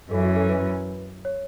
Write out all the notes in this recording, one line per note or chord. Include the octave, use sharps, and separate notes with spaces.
F#2 E3 C#4 A4
F#4
A4
B4
C#5